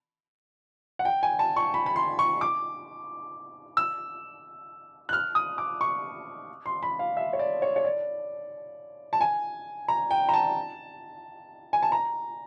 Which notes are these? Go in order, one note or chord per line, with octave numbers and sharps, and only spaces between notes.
F#5
G5
G#5
A5
C#6
B5
B5
C6
C#6
D6
E6
F#6
F6
D#6
D6
C#6
C6
B5
F5
E5
C#5
D5
C#5
C#5
D5
A5
G#5
A#5
G5
A#5
A5
G#5
A5
A#5